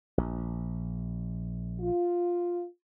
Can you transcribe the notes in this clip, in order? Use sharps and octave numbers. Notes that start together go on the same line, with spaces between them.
A#1
F4